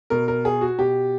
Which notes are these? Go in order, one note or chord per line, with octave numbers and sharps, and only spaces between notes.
B2 A#4
A#4
G#4
F#4
B2 G4